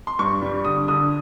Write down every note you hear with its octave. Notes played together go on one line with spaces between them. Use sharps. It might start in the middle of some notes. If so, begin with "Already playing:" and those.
C6
G2 C#6
G3
D3 D#6
D3 D#6